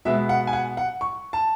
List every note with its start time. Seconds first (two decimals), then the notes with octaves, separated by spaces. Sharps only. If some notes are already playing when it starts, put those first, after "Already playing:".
0.05 B2 G#3 B3 E5
0.29 F#5
0.47 G#5
0.53 F#5
0.77 F#5
1.01 C#6
1.33 A5